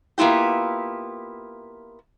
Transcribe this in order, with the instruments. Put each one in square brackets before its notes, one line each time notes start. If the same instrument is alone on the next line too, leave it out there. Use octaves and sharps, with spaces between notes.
[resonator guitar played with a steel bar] A#3 B3 E4 F4 G4